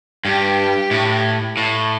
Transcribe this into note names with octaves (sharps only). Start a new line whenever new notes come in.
G2 G4
A2
A2